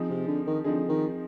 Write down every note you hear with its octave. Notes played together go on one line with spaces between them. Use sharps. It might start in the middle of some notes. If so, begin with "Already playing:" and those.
Already playing: F3 C4 D#4 G#4
C3
D3
D#3
D3 F3 C4 D#4 G#4
D#3